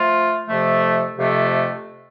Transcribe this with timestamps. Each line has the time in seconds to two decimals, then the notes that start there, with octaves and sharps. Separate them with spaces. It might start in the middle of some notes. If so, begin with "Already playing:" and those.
Already playing: F3 A3 F4
0.48 F2 C3 F3 A3
1.17 F2 C3 F3 A3